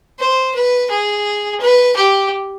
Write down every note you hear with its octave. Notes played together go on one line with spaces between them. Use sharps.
C5
B4
G#4
B4
G4